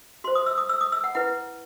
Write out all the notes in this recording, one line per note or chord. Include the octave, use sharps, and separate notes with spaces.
F#4 C5 C6
D#6
E6
D#6
E6
D#6
E6
F#5
E4 B4 F#5